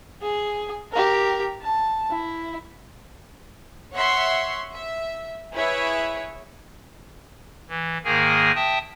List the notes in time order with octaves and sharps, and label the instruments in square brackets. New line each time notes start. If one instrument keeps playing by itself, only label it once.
[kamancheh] G#4
G4 A#4
A5
E4
[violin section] C#5 E5 F#5 C6 C#6
E5
E4 G#4 B4 C#5 E5
[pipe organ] E3
G#2 D#3 A#3 G#4 A#4 G#5
E5 G5 A5 D#6